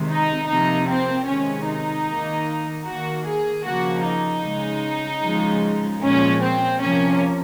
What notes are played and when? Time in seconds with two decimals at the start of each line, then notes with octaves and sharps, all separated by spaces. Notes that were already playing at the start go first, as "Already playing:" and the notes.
Already playing: C3 D#3 G#3
0.09 D#4
0.48 C3 F3 A#3 D#4
0.88 C4
1.27 C3 D#3 G#3 C#4
1.67 D#4
2.07 D#3 A#3
2.86 D#3 A#3 F#4
3.25 G#4
3.64 C#3 F3 A#3 F#4
4.04 D#4
4.44 C#3 G#3
5.22 C#3 F3 G#3
6.01 A#2 F3 G#3 C#4
6.41 C4
6.81 C3 F3 A#3 C#4